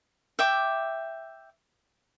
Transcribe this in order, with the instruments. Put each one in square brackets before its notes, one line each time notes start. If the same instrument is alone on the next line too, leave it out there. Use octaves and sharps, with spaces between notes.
[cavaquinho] E5 G5 D6